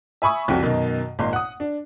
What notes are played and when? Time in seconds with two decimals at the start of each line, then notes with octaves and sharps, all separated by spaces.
0.22 E5 G#5 B5 C#6 D#6
0.48 C2 F2 C3 F#4
0.62 F#2 B2 D#3 D#4
1.19 G#1 A#2 D#4 C6
1.33 F#5 D#6
1.60 D4